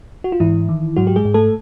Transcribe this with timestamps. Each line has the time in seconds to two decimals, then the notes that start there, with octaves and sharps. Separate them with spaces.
0.24 F#4
0.32 F4
0.40 G#2 E3 E4
0.69 D#3
0.96 G#2 F#3 F#4
1.07 G4
1.16 G#3 G#4
1.25 G#2
1.34 A3 A4